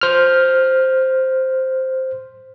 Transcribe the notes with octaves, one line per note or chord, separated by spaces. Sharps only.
C5 F6